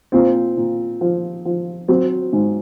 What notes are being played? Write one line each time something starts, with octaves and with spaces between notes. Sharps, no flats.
A#2 C4
A#2
F3
F3
F#3 C4
G#2